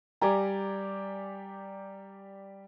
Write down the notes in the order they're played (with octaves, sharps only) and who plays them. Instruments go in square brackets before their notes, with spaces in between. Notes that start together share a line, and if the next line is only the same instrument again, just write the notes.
[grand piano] G3 G4 [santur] D5 G#5 A#5